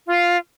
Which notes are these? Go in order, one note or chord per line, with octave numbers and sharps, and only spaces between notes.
F4